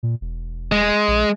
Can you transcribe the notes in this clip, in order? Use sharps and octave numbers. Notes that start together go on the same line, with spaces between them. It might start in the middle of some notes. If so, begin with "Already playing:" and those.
A#2
E1
G#3
A#1